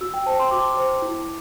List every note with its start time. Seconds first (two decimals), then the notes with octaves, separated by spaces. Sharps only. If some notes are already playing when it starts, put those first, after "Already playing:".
0.01 F#4 E6
0.14 G5
0.26 C5 A5
0.39 C6
0.51 F#4 D6
0.77 C5
1.02 E4